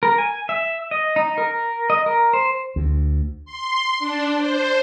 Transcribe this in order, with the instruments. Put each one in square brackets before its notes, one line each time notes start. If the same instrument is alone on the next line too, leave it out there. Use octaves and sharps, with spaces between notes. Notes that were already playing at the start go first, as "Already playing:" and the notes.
[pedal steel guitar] A#4
G#5
E5
D#5
D#4
A#4
D#5
A#4
C5
[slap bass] D2
[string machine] C6
D4
C5